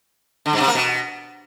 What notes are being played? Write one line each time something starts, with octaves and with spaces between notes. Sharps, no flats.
D3
G2
C3
A#3
B2